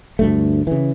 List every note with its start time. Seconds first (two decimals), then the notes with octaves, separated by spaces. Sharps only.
0.19 D2 G2 A3
0.67 C#3 E3